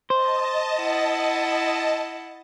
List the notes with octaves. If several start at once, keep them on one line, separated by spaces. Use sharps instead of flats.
C5 D#5 A5
E4 F#5